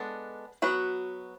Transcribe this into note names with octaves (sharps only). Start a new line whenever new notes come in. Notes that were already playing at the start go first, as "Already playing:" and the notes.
Already playing: G#3 B3 D4 A4
F#3 B3 F#4 B4